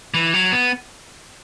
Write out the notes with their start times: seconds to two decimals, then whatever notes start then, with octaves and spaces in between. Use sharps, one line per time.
0.14 E3
0.34 F#3
0.52 B3